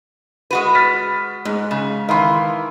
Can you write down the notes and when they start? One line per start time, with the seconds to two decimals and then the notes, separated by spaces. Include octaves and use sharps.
0.51 G#3 F#4 B4
0.75 F6 A6 B6
1.45 G#2 G#3
1.71 C#3
2.09 D#3 E3 F5 B5 C6